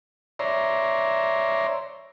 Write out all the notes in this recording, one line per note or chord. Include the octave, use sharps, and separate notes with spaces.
C#5 D5 E5 A#5 C6